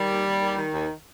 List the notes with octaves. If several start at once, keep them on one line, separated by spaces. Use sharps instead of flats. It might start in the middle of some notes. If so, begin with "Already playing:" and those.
Already playing: D#3 G3
D#2
D#2
D#3
D#3
D#2